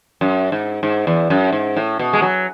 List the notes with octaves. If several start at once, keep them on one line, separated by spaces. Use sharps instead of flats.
F#2
G#2
G#2
E2
F#2
G#2
A2
B2
G#3
F#3